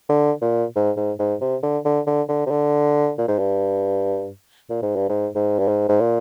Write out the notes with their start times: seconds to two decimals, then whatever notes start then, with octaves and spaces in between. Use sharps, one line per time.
0.09 D3
0.42 A#2
0.76 G#2
0.97 G#2
1.19 G#2
1.41 C3
1.63 D3
1.85 D3
2.07 D3
2.29 D3
2.46 C3
2.51 D3
3.18 A#2
3.28 G#2
3.39 G2
4.69 A#2
4.82 G#2
4.96 G2
5.09 G#2
5.35 G#2
5.59 G2
5.68 G#2
5.89 G#2
6.00 A#2